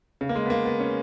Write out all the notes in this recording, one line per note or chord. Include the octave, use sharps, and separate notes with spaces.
C#3
A#3
G#3
B3
A#3
B3
C#4